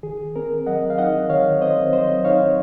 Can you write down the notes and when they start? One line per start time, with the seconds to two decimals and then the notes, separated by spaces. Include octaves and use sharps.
0.03 D#3 G#4
0.36 C4 A#4
0.66 F#3 D#5 F#5
0.90 F5
0.98 D#4 D#5 F#5
1.29 D#3 C#5 F5
1.61 C4 C5 D#5
1.93 F#3 C5 D#5
2.24 D#4 C#5 F5